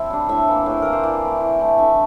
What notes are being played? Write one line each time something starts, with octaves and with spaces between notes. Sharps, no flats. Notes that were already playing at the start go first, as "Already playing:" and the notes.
Already playing: C4 E4 E5 A5
G3 D4
A2 E5
E3 A#3
A2
E3 A#3 A#4
C5
E3 D5
A3 E4
E3
A3 E4
D3 E5